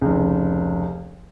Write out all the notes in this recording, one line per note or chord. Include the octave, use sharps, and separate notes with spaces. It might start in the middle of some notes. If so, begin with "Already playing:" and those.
F1 C#2